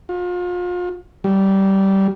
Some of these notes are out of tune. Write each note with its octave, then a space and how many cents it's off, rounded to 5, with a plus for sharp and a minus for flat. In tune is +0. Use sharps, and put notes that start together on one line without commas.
F4 +35
G3 -15